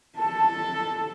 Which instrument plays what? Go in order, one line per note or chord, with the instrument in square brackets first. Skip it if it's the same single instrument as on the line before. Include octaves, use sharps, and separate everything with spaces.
[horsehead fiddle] A4 [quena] A5